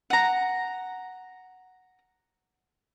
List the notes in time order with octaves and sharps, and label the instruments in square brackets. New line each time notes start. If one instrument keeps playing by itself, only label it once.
[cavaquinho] F#5 A#5